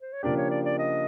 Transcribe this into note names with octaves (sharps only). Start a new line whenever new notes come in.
C5
C#5
C#3 F3 A#3 D4 G4 D5
C#5
D5
D5
D#5